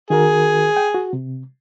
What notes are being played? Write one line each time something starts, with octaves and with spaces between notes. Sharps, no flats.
D#3 F#4 G#4 A#4
G5
F#4
C3